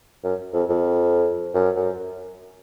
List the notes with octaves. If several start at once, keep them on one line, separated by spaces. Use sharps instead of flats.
F#2
F2
F2
F#2
F#2